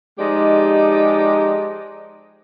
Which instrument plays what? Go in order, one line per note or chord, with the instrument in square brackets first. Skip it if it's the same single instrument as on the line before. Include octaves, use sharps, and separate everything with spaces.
[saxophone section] F3 G#3 D#4 G4 D5 D#5